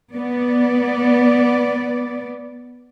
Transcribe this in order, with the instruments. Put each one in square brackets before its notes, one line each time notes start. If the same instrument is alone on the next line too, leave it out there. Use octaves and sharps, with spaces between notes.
[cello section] B3 D5